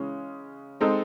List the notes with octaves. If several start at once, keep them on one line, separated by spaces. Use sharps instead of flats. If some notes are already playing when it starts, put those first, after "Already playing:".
Already playing: C#3 E3 G#3 C#4
G#3 C4 D#4 A4